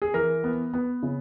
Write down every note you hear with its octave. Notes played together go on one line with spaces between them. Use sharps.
G#4
E3 A#4
B3
B3
C#3